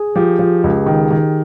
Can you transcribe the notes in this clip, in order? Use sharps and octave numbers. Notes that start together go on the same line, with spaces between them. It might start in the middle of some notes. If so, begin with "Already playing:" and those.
Already playing: G#4
F3 G4
F3
C#2
D#3
D#3